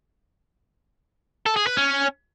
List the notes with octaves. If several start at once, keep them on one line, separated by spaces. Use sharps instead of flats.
A4
G#4
B4
C#4